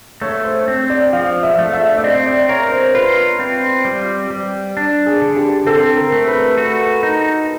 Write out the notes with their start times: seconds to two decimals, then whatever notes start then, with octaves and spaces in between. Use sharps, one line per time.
0.21 A3 C#5
0.44 C5
0.68 C4
0.90 D5
1.13 F3 F5
1.43 E5
1.59 A3
1.73 E5
1.97 D5
2.03 C4 D#5
2.26 D5
2.49 A#4 C#5
2.72 C5
2.94 F4 B4
3.40 C4
3.85 G3
4.30 G3
4.77 D4
5.06 G#4
5.22 D3
5.37 G4
5.67 C4 A4
5.97 A#4
6.12 A3
6.27 B4
6.57 F#4
7.03 D#4